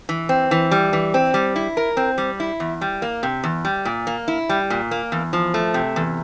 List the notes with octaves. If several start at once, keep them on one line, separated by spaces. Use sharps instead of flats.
E3
C4
E3
G3
E3
C4
G3
E4
A#4
C4
G3
E4
E2
G3
A#3
C3
E2
G3
A#2
A#3
E4
G3
A#2
A#3
E2
F3
A3
C3
E2